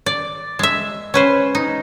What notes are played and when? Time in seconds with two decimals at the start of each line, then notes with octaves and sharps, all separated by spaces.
0.06 D5
0.59 G#3 E5
1.14 C#4 B4 C5
1.55 D#4